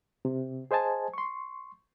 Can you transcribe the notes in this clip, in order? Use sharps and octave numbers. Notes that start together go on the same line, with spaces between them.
C3
G#4 C5 D#5 G#5 A5
C6 C#6